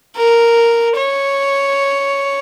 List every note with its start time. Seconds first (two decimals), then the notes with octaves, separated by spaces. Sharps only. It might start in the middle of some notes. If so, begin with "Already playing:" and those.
0.16 A#4
0.97 C#5